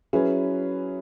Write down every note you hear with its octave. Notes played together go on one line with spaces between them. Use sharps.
F#3 C#4 E4 G#4 B4